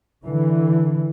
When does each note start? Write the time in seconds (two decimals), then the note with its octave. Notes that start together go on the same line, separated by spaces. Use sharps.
0.25 D3 E3